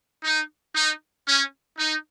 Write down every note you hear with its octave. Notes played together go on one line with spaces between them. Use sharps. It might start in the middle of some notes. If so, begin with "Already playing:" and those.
D#4
D#4
C#4
D#4